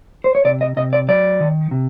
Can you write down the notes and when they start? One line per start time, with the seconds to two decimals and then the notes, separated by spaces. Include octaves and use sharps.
0.24 C5
0.35 C#5
0.45 C3 D5
0.61 D#5
0.77 C3 D#5
0.93 D5
1.08 F#3 D5
1.40 D#3
1.71 C3